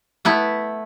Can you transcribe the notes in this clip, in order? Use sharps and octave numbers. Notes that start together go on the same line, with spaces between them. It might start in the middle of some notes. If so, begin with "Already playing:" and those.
A3 B3 E4